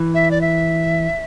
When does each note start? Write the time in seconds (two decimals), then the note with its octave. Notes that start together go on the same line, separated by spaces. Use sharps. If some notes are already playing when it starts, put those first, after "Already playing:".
Already playing: E3
0.14 E5
0.31 D5
0.41 E5